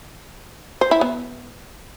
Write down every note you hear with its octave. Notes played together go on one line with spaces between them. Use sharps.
C5
E4
B3